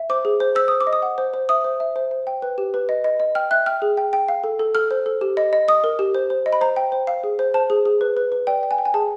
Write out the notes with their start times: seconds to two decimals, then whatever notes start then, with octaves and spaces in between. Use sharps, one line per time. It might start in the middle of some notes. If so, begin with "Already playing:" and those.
Already playing: E5
0.10 C5 D6
0.25 G#4
0.40 C5
0.55 C5 E6
0.68 C5 D#6
0.81 D6
0.87 D#5
0.93 D#6
1.02 F#5
1.18 C5
1.34 C5
1.49 E5 D#6
1.64 C5
1.80 E5
1.96 C5
2.11 C5
2.27 G5
2.42 B4
2.58 G4
2.74 B4
2.89 D#5
3.04 D#5
3.20 D#5
3.35 G5 F6
3.51 E5 F#6
3.66 G5 F6
3.82 G#4
3.97 G5
4.13 G5
4.28 F5
4.44 A4
4.59 A4
4.75 A4 F6
4.91 C5
5.06 A4
5.21 G4
5.37 D#5
5.53 D#5
5.68 D#5 D#6
5.84 A#4
5.99 G4
6.15 C5
6.30 C5
6.46 D#5
6.53 B5
6.61 C5 A#5
6.76 G5
6.92 C5
7.07 F5
7.24 G#4
7.39 C5
7.54 C5 A5
7.70 G#4
7.85 G#4
8.01 B4
8.17 B4
8.32 B4
8.47 D5 G5
8.63 G5
8.71 G#5
8.78 G5
8.85 G#5
8.94 G#4 A5